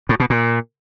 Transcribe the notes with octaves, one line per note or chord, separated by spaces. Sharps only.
A2
B2
A#2